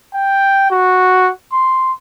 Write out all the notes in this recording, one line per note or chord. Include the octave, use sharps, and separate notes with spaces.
G5
F#4
C6